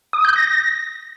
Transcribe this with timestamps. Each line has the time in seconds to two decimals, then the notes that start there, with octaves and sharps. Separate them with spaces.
0.13 D#6
0.25 G6
0.36 A#6
0.47 A#6